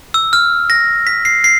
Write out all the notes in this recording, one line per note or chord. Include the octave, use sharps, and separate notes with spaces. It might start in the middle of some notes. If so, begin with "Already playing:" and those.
E6
F6
A#6
B6
C7
C7